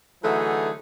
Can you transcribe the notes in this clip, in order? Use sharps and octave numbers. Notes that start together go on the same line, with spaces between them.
D3 E3 F#3 A3 D#4 G#4